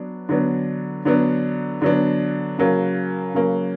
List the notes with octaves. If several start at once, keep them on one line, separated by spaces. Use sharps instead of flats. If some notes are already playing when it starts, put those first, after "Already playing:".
Already playing: F#3 B3 D4
D3 F#3 B3 D4
D3 F#3 B3 D4
D3 F#3 B3 D4
C#3 F#3 A#3
C#3 F#3 A#3